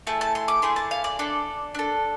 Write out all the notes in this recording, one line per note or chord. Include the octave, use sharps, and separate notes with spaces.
A3 E4 G#4 A5
A5
C6
D6
A3 E4 G#4 C6
A5
F5
D5
D4 A4
D4 A4